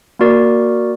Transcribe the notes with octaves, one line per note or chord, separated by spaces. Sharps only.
A#3 F#4 A#4 D5